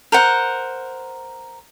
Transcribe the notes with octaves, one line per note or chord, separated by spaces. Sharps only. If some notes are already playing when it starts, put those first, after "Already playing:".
A#4 C5 F#5